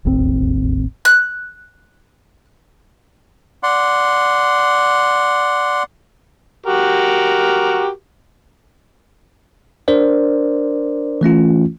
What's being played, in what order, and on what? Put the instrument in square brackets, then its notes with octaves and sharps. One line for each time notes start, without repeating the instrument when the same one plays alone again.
[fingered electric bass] E1 A1 D#2 C4
[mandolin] F#6
[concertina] D5 F#5 C6
[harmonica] F#4 G4 A#4
[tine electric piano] D4 A#4 C5 D5
E3 A3 C#4 F4